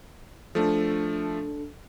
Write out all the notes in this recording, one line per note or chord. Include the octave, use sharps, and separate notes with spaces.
F3 A3 D4 A4